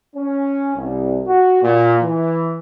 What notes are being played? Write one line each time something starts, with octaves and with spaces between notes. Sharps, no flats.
C#4
C2
F#4
A#2
E3